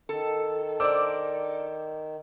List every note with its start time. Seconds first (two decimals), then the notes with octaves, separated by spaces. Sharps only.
0.09 D#3 A4
0.80 D4 A#4 C5 D5 D6 E6